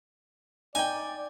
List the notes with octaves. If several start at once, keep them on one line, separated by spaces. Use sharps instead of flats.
D#4 D5 G5 G#5